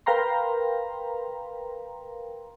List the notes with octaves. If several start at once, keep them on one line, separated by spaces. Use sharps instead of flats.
A#4 B4 F5 G5 A#5 C6